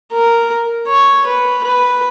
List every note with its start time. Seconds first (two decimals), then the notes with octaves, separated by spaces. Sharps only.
0.13 A#4
0.88 C#5
1.26 B4
1.64 B4